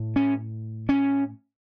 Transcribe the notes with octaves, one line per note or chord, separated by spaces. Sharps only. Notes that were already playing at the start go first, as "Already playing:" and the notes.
Already playing: A2
C#4
C#4